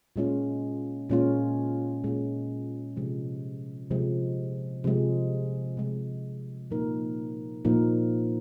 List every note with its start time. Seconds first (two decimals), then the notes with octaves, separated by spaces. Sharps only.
0.16 A#2 G#3 C#4 F4
1.10 A#2 G#3 C#4 F4
2.04 A#2 G#3 C#4 F4
2.96 C3 F3 G#3
3.91 C3 F3 G#3
4.84 C3 F3 G#3
5.77 C3 F3 G#3
6.71 A#2 F3 A#3 D#4 A#4
7.65 A#2 F3 A#3 D#4 A#4